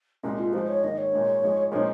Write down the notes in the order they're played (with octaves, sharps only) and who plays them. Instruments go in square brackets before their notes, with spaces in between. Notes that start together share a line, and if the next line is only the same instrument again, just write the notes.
[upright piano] C2 A#2 G#3 [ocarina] C#4
[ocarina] F4
[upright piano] G#2 F3 G#3 [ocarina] C5
[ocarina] C#5
[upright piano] G#2 D#3 A#3 [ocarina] D#5
[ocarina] C#5
[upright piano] A#2 G#3 D#4
G#2 F3 G#3
[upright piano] A#2 F3 G#3 C4 D#4 [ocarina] C#5